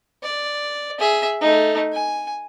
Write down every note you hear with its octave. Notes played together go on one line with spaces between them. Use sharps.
D5
G#4 E5
A3 D#4
G#5